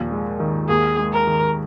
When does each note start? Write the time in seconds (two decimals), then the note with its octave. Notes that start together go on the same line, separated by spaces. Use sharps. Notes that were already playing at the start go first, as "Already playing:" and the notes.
Already playing: D#2 A#2 F3
0.11 G#3
0.40 D#3
0.69 D#2 G#4
0.98 G#3
1.13 A#4
1.27 D#3